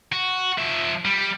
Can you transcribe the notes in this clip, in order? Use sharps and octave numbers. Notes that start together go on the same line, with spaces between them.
F#4
F3 E5
G3